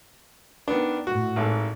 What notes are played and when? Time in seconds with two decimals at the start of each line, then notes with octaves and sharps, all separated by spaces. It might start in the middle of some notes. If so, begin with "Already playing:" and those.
0.68 D#3 B3 D4
1.07 A2 F#4
1.36 G#1 G#2 A4